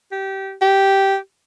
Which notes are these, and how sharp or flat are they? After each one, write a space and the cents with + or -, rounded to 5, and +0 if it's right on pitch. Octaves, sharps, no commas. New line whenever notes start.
G4 -20
G4 -10